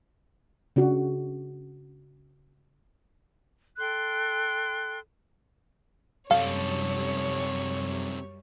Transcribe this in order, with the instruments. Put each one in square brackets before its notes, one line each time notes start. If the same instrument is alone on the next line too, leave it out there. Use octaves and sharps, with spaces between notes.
[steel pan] C#3 D4 F#4
[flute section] A4 G5 C6 F#6
[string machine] F#2 G3 [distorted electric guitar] C3 A4 [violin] C#5 [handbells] F5